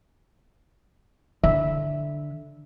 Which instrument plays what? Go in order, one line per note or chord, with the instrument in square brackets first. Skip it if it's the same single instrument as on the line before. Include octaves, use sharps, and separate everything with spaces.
[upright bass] D3 [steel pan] E5